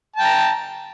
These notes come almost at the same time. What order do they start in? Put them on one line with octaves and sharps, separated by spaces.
A5 G5 A#5